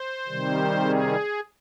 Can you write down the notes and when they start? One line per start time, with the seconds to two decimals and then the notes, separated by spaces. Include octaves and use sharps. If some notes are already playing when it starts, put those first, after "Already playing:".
Already playing: C5
0.28 C3 D#3 G3
0.82 G#4